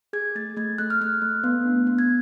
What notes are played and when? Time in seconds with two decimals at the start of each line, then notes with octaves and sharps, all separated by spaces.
0.13 G#4 G#6
0.35 A3 A6
0.57 A3 G#6
0.78 A3 F#6
0.90 F6
1.01 A3 F#6
1.22 A3
1.44 B3
1.65 D4
1.87 B3
1.99 G#6